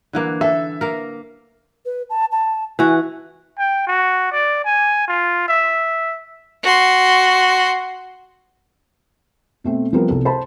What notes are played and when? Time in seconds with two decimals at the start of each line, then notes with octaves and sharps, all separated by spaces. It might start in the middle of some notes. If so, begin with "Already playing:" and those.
0.13 D3 E3 A#3
0.41 A4 E5
0.81 A#3 A#4
1.85 B4
2.10 A5
2.31 A5
2.79 E3 F#4 G#5
3.58 G5
3.87 F#4
4.32 D5
4.65 G#5
5.08 F4
5.48 E5
6.63 F#4 C6
9.64 B2 A3 C4
9.93 F3 G3 B3 C4 A#4
10.08 C2 A4
10.25 C5 A5 B5